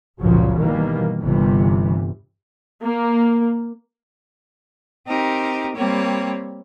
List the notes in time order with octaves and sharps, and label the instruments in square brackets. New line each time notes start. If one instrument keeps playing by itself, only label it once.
[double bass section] G1 C#2 A#2 C#3 F3 F#3
B2 D#3 E3 G3 A#3
G1 C3 E3 G3
[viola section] A#3
[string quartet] C4 D#4 G4 A#4
G3 A#3 C4 C#5